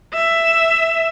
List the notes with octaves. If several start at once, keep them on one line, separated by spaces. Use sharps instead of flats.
E5